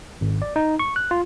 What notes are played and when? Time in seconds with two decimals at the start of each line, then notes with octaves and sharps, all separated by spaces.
0.21 G#1
0.42 D5
0.56 D#4
0.79 C#6
0.96 F#6
1.11 F4